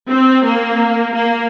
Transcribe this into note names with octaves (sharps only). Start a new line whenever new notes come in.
C4
A#3
A#3